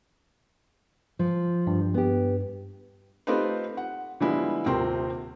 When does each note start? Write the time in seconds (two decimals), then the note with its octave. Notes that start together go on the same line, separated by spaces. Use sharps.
1.19 F3
1.67 G2
1.94 B3 G4
3.27 A3 C4 D#4 F4 G4 B4
3.77 F#5
4.20 D3 F3 G3 G#3 B3 E4
4.66 D#1 C3 C4 A#4 G5 C6